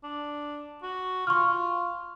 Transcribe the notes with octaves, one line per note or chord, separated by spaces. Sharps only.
D4
F#4
F4 C#6 F6
F4